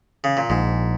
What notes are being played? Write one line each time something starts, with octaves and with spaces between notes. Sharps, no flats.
C#3
A#2
A#1 G#2